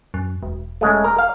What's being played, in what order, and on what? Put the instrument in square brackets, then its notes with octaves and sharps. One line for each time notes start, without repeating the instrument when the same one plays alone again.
[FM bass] F#2
E1
[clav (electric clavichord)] C#3 G#3 A3
A#4
F5